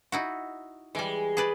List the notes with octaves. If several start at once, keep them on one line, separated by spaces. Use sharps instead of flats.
D#4 E4 F#4
E3 G3 G#3
G#4 B4 D5